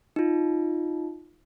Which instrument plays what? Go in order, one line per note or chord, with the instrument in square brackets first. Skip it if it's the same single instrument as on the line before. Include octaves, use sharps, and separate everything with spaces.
[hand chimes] D#4 F4